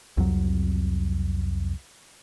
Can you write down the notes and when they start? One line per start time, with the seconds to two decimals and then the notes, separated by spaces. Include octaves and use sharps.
0.17 C2 F2 F#3